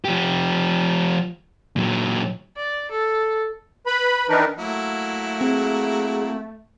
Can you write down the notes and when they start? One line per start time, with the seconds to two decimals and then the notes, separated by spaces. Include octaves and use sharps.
0.05 F3 G4
1.76 A#2 F#3
2.57 D5
2.91 A4
3.87 B4 B5
4.29 D#3 E3 D4 D#4 A#4 B4
4.56 F#3 A3 A#3 E4
5.41 C4 G#4